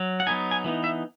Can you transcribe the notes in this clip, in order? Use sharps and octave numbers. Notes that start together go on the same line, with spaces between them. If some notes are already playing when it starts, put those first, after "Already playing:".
Already playing: F#3
F#5
F#3 B3 D#4 G#5
G#5
E3 B3 D#4
E5